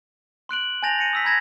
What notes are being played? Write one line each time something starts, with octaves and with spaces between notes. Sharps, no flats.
C6 F#6 D7 F#7
G#5 A5 G6 A6 A#6 F7
A#6 C#7 D#7
D#6 E6 B6
A#5 B5 G#6 A#6 E7